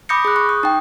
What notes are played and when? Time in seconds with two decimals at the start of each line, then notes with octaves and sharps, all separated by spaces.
0.09 B5 D6 D#6 G6 A#6 C#7
0.25 G#4 F#6
0.36 C#6
0.49 D#6
0.63 D#4 G5